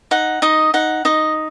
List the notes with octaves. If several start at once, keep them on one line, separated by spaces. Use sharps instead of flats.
D#4 F#5
D#4 D#5
D#4 F#5
D#4 D#5